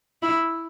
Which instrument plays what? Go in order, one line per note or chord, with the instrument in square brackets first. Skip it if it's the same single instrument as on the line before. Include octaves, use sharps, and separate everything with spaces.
[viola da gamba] E4